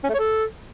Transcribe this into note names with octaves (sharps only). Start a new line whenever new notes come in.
C#4
A3
C#5
A4